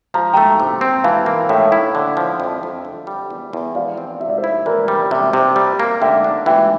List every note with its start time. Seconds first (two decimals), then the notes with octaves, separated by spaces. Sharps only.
0.14 F3 A#5
0.33 A3 G5 A#5
0.60 C3
0.81 C4
1.04 E3 F5 A5
1.26 A#3
1.49 A2 E5 G5
1.72 E4
1.95 D3
2.17 F3
2.40 F2
2.63 F2
2.85 D3
3.07 G3
3.30 E2
3.53 E2
3.75 F3 D5 F5
3.98 C4
4.21 C3 E5
4.29 D5
4.38 C5 E5
4.44 E4
4.66 E3 A#4 D5
4.88 G3
5.11 C3 C5 E5
5.33 C3
5.56 G3
5.79 A#3
6.01 D3 E5 G5
6.24 D4
6.46 E3 E5 G5